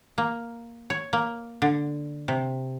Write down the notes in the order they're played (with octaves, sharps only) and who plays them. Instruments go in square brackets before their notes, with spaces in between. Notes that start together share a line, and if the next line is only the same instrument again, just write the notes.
[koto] A#3
C#5
A#3
D3
C3